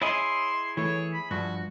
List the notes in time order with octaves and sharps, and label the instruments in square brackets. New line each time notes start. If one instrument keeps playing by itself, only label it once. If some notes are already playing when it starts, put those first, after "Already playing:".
[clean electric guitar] E4 G#4 [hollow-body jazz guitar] C#5 D#5 [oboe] C6
[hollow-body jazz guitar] E3 A3 [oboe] C#5
[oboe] B5
[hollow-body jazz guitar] G2 F3 [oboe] F#4